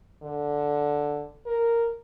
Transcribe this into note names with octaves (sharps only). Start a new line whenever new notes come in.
D3
A#4